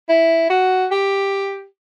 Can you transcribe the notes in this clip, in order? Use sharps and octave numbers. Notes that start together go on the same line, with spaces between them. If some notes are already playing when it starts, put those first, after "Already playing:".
E4
F#4
G4